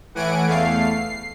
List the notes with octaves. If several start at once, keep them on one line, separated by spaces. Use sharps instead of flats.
A2 E3 F#5 G#5 D7
E2 A3 F5 C7
C7